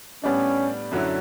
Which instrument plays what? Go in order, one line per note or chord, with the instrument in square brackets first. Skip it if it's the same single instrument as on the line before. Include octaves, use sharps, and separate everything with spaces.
[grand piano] A2 G3 B3 D4 [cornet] C#4
[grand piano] F#2 D3 F#3 C#4 E4